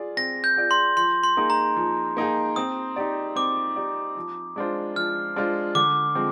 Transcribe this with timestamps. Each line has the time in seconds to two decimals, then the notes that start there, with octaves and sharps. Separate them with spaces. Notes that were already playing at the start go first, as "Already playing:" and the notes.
Already playing: F4 G#4 D5
0.17 C4 A#6
0.44 G6
0.56 F4 G#4 D5
0.71 C6
0.97 F3 C6
1.23 C6
1.37 A#3 D#4 G#4
1.50 A#5
1.76 F3
2.17 A#3 D#4 G#4
2.56 C4 D#6
2.96 D#4 G4 D5
3.36 C4 D6
3.76 D#4 G4 D5
4.17 F3
4.56 G#3 D4 F4 C5
4.96 F3 F6
5.36 G#3 D4 F4 C5
5.75 D3 D6
6.15 F3 G#3 C4